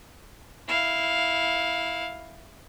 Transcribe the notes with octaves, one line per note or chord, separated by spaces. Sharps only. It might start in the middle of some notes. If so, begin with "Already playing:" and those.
E4 F5